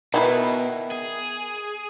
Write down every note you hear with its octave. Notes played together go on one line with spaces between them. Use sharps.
B2 D#3 E4 B4
G#4